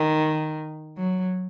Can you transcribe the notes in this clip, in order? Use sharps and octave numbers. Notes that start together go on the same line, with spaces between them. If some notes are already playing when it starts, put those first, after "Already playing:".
Already playing: D#3
F#3